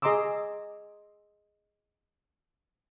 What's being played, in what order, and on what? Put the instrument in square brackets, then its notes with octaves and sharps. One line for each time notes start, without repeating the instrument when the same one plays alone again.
[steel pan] G#4 D#5 A#5 C6 D6 E6